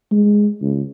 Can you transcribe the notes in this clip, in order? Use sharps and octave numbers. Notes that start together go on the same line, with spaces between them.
G#3
C#2